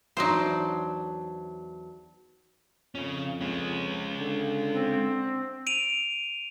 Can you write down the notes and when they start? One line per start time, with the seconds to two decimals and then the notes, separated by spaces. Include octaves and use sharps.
0.17 E2 F#3 D4 D#4 C5
2.95 F2 C#3 C#4
3.41 G#3 C#4
4.20 D3
4.73 C4
5.67 D7 D#7 F7